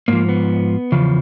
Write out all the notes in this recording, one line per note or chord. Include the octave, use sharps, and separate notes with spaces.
G#2 F3 A#3
B3
E2 C#3 F3